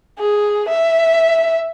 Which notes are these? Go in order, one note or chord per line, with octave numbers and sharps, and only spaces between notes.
G#4
E5